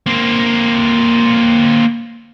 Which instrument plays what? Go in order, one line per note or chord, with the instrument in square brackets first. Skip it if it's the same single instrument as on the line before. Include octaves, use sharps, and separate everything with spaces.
[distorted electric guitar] A#3 C4